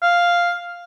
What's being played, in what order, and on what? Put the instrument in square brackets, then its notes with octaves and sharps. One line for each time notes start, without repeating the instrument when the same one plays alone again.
[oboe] F5